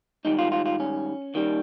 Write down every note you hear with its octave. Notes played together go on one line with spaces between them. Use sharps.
G#2 D#3 G3 D#4
F4
F4
F4
C#4
D#2 D#3 G3